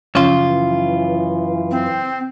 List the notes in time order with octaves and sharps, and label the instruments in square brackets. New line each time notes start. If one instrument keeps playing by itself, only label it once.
[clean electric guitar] F#2 F4 [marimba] C#3 F3 C#4
[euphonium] E3
[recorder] C4